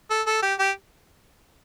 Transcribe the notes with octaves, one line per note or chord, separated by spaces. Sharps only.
A4
A4
G4
G4